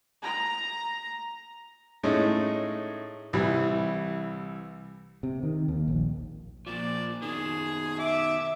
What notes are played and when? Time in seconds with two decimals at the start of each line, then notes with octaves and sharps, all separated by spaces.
0.23 A#5
2.03 A2 G#3 A3 C#4 D#4
3.33 C2 E3 G3
5.23 C3
5.43 D#3
5.68 D#2
5.88 A#1
6.67 A#2 F3 D5
7.22 B2 D#3 G#4
7.99 E5 D6